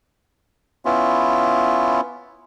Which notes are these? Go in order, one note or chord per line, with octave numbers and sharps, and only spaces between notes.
B3 C#4 E4 F4